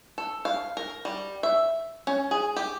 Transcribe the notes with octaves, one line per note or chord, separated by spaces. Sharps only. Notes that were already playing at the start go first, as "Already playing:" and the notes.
A4
F5
A#4
G3
E5
C#4
G#4
G4